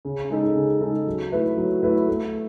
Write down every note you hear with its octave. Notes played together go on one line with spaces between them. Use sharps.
C#3
G#3 D#4 A4
C#3
G#3 D#4 A4
F#3
A3 E4 B4
F#3
A3 E4 B4
A3